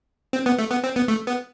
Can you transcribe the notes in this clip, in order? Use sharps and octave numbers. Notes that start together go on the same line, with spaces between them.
C4
B3
A3
B3
C4
B3
A3
B3